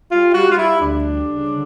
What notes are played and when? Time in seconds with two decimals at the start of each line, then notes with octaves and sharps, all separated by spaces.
0.12 G3 F4
0.35 G3 F#4
0.52 F4
0.58 G3 E4
0.81 D2 D4
1.04 G3
1.27 C#3
1.50 D3